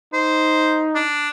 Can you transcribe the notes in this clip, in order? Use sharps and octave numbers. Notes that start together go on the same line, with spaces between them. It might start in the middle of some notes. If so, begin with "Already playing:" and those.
D#4 C5
D4